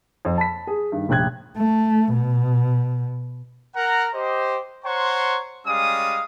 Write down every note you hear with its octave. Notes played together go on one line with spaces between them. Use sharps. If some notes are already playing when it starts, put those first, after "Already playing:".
F2
A5 B5 B6
G#4
G2 D#3
F1 A#1 G5 F#6 G#6
A3
B2
A#4 F#5 A#5
G4 C5 D#5
C5 C#5 F#5 A#5 C6 C#6
G3 G#3 C#4 F5 D#6